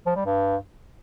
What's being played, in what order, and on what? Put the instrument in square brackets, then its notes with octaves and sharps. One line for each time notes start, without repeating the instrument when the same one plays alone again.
[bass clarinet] F3
G3
G2